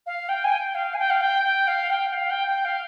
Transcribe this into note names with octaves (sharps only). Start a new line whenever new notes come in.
F5
G5
G#5
G5
F5
G#5
G5
F5
G5
G5
F5
G5
F5
G5
G5
F5